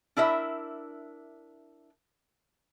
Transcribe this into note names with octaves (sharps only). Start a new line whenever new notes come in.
D4 E4 A#4 E5